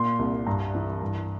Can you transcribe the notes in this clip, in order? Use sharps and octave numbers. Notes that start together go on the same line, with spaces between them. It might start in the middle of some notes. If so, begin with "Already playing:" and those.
Already playing: A#2 C6
C2
G2 A#5
E3
G2